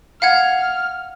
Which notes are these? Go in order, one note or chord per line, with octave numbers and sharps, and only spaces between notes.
F5 F#5 F6 G#6